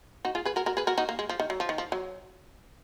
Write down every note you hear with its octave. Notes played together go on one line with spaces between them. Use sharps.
D#4 F#4
F4 G#4
G#4 B4
F#4 A#4
F#4 A#4
G#4 B4
F#4 A#4
D#4 F#4
A#3
G#3
F3
D#3
F#3
F3
D#3
F3
F#3